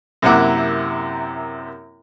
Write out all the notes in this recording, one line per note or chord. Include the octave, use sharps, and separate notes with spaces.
F#2 C3 A#3 E4 F#5 D6